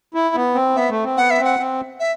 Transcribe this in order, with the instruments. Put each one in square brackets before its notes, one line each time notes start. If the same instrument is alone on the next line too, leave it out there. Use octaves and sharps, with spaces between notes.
[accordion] E4
B3
C4
[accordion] B3 [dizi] E5
[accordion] A3
C4
[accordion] B3 [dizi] F#5
[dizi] E5
[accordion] C4
[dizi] F#5
[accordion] C4
[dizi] E5